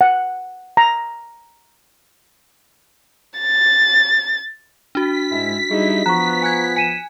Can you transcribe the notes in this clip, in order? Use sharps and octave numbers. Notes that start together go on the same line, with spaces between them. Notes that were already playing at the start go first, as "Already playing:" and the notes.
F#5
A#5
A6
D4 F#4 B6
G#2 G#3 E4
G3 D#4 E4 G#4
F3 B3 A#5 C#6 F#6
G#5 F#6 G#6
G#5 B6 D#7 E7